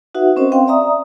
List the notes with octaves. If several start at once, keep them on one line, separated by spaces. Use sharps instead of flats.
D#4 F#4 B4 E5 F#5
C4 C#4 A#4 C5 D#5
C4 F5 G5 C6
D5 E5 A#5 D#6